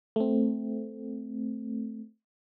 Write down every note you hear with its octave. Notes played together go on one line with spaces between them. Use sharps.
A3 C4